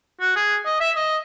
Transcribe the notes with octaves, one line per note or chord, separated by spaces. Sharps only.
F#4
G#4
D#5
E5
D#5